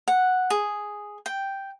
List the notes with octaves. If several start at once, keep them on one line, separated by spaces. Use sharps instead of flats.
F#5
G#4
G5